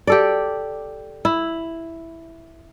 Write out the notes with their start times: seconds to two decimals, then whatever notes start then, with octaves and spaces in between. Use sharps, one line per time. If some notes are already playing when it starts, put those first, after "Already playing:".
0.07 G4 A4 D5
1.25 E4